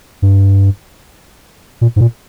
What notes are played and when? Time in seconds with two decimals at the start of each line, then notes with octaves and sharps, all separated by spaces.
0.22 G2
1.81 A#2
1.96 G#2
2.01 A#2